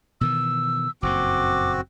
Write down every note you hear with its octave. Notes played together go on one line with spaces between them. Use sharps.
B2 D#3 E3 E6
F#1 F2 A#2 C4 F#4 D6